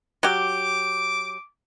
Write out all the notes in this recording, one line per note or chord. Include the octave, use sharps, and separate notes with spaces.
F#3 G4 D6